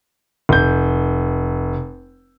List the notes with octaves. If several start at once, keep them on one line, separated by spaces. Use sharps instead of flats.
F1 G6